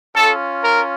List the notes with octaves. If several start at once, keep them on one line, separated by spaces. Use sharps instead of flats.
C#4 F4 A4
A#4